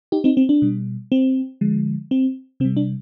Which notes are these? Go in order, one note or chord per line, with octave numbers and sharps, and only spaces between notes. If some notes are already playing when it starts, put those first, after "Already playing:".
D#4 G4
C4 D#4
C4
D4
B2 G3
C4
D3 F3 G#3
C4
C3 G3 C4
D4